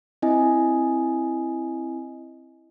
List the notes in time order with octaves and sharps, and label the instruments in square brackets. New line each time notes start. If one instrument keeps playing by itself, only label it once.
[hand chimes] C4 E4 D#5 G#5